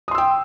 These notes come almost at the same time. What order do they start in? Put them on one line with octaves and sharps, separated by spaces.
D#6 C6 E6 G5